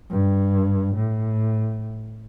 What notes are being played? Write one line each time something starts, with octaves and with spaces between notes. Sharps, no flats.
G2
A2